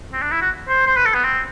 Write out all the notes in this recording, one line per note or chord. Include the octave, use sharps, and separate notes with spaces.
C4
D4
E4
F#4
C5
C5
B4
A4
B3
C4